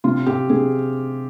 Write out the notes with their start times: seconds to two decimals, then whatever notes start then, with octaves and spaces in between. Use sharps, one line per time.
0.04 C3 F4
0.26 C4 G4
0.50 C3 G#4